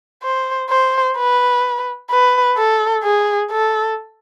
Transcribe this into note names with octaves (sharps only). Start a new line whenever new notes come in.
C5
C5
B4
B4
A4
G#4
A4